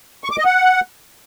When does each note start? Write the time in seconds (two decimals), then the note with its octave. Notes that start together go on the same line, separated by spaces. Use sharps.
0.24 C#6
0.31 D6
0.38 D#5
0.45 F#5